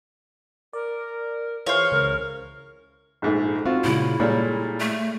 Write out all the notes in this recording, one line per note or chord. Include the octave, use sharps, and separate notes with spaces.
A#4 D5
E3 F4 G#4 C5 C#5 F6
C#2 C#3 A#4
A#1 G#2 A3
C4 F4 F#4
A#2 C#3 G#3 E4
A#2 G3 G#3 A4 C#5
A3